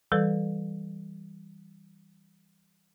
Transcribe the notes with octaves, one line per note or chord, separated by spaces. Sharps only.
E3 G3 A4 B4